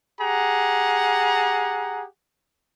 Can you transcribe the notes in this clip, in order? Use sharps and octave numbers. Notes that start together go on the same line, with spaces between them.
G4 G#4 F#5 A#5